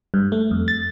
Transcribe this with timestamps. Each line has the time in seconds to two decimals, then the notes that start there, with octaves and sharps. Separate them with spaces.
0.14 G2
0.32 A3
0.51 F2
0.68 A6